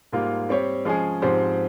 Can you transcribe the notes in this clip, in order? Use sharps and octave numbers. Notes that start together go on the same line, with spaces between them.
G#2 G3 A#3 F4
G3 C4 G4 C#5
F3 G#3 C#4 G#4
G#2 F3 C4 G4 C5